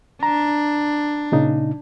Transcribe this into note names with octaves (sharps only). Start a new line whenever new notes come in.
D4 A#5
A#2 C#3 D#4